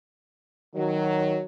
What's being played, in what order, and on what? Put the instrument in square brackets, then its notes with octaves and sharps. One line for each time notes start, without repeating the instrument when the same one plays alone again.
[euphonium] D#3 [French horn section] F#3